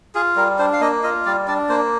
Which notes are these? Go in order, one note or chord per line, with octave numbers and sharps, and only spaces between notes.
F4 G#4
G3 A#4
D4 C5
F5
A#3 D#5
F4 D#5
G3 D5
D4 D5
A#3 C5